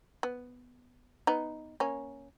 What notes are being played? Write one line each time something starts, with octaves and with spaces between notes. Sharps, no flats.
B3
B3 D#4
A#3 C#4